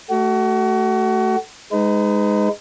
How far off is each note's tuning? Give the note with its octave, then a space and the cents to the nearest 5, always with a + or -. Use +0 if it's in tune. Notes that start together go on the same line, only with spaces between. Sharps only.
A3 +0 F#4 +30
G#3 +0 D#4 +0 B4 +40